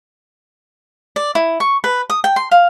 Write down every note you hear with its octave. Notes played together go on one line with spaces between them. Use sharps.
D5
E4
C#6
B4
D#6
G5
C6
F5